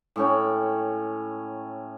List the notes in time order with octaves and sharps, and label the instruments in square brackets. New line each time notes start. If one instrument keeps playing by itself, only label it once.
[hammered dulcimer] A2 C#4 G5